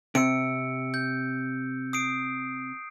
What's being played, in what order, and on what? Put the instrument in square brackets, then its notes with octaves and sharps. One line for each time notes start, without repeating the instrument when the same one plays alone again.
[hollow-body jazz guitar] C3 [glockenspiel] E6 C#7 D7
[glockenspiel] G6
D#6 C7 D7